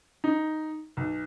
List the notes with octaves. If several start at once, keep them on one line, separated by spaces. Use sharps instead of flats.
D#4
B1